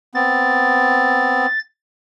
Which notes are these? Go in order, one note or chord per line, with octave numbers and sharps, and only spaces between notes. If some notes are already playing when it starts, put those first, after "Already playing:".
B3 C4 A6